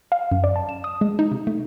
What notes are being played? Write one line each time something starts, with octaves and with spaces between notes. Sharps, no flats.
F5
F#2
D5
A5
E7
D#6
G#3
D#4
C3
A3